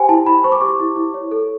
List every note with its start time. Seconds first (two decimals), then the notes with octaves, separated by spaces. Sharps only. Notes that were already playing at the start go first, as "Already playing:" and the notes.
Already playing: G4 C5 G5 G#5
0.09 E4 A5
0.26 E4 B5
0.44 C5 C#6
0.52 D6
0.61 G4 C#6
0.80 E4
0.96 E4
1.14 C#5
1.31 A4